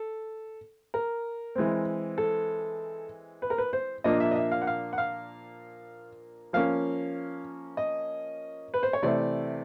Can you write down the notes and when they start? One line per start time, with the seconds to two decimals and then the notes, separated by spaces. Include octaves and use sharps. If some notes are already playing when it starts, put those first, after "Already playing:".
Already playing: A4
0.94 A#4
1.56 E3 G#3 C4
2.18 A4
3.42 B4
3.50 A#4
3.58 B4
3.73 C5
4.04 A#2 F3 A#3 D4 D#5
4.20 E5
4.31 D#5
4.36 E5
4.52 F5
4.62 F#5
4.67 F5
4.93 F#5
4.98 F5
6.53 F3 A#3 C#4 F5
7.77 D#5
8.74 B4
8.83 C5
8.93 C#5
9.03 C3 E3 A3 C4 D5